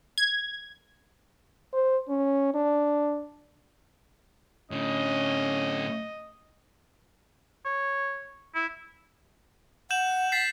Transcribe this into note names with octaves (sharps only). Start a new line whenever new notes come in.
G#6
C5
C#4
D4
A2 D3 C#4 D#5
C#5
E4
F#5 G6 E7 F#7
A6 B6 C7